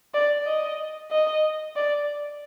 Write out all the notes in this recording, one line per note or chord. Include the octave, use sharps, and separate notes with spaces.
D5
D#5
D#5
D5